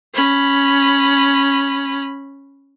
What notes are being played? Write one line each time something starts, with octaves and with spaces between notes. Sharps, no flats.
C#4 B5